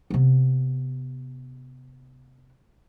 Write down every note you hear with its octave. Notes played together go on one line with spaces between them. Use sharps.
C3 B3